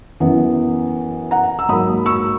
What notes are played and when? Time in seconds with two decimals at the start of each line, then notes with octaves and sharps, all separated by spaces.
0.20 F#2 E3 B3
1.31 F#5 A#5
1.59 E6
1.69 G#2 F#3 A#3 B5 D#6
2.06 C#6 E6